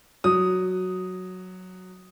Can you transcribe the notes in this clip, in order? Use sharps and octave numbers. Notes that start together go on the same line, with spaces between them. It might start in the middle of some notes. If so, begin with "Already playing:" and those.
F#3 D#6